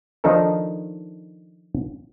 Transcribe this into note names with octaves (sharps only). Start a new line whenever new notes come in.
D#3 F3 D4 D#4 A4 A#4